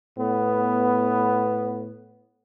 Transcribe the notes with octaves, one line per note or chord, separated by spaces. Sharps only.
A2 B3